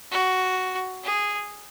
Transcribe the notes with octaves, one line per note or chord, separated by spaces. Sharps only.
F#4
G#4